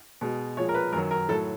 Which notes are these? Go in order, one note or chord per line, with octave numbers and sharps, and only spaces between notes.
B2 G#3
A#2 F3 G#3 C#5
A#4
B4
F#2 D#3 F#3 A#4
A#4
A2 F#3 A4